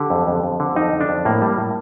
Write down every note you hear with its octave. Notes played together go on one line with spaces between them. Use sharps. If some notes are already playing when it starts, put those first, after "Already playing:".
Already playing: D3 G4
F2
F2
F2
D3
F2 D#4
F2
D4
F2
A2 A#3
G3
A#3
A2